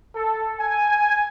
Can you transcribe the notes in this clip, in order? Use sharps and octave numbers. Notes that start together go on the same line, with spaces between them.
A4
G#5